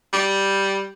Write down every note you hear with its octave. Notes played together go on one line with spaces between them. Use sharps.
G3